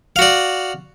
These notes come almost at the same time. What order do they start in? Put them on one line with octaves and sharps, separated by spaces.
F5 F#4 D5